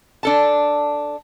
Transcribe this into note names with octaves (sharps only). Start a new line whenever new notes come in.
D4 A4 A5